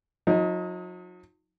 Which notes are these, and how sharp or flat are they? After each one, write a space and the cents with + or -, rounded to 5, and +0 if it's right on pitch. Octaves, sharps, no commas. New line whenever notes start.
F#3 -40 D#4 +20